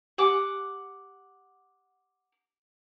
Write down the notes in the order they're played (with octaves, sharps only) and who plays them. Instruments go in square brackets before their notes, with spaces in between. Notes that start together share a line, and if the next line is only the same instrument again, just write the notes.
[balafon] G4 G#5 [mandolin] F#5 D6